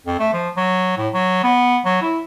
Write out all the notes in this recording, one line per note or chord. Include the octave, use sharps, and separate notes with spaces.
F2
A3
F3
F#3
A2
F#3
B3
F#3
E4